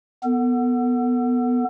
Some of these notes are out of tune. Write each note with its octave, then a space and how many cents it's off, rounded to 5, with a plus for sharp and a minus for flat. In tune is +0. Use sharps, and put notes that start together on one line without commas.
B3 +0 A4 +35